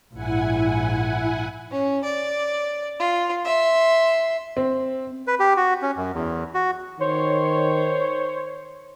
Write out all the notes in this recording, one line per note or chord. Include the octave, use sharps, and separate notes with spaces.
A#1 G#2 E4 F#5 G#5
C#4
D5
F4
E5 C6
C4
B4
G4
F#4
C#4
F#2
E2
F#4
D#3 C5 C#5